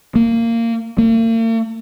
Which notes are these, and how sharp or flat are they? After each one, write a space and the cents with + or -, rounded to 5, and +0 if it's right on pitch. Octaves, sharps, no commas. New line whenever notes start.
A#3 -20
A#3 -45